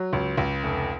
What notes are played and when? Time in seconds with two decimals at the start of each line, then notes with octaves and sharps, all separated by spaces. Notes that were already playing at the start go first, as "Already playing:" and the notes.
Already playing: F#3
0.13 C#2
0.37 C#2
0.63 F1